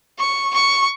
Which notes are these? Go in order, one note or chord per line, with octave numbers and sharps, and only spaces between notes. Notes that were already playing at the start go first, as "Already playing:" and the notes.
C#6
C#6